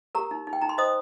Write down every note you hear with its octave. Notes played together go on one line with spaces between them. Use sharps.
G4 A#4 A#5
D#4
D#4
G5
D#4 A#5
C6
C5 D#5 D#6